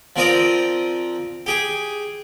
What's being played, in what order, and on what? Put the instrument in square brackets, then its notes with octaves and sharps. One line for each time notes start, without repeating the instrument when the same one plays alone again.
[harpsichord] F3 C4 A#4 D5 D#6
G4 G#4